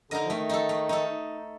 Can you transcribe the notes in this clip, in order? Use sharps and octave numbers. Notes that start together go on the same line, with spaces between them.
D3 D#4 A#4 D#5
F3
D#3 A3
D#4 A4
A3
D#4 A4